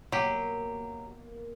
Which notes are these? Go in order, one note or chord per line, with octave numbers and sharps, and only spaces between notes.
B2 F#3 A#3 G4